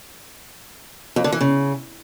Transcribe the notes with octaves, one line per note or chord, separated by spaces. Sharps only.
F2
D3
E3
C#3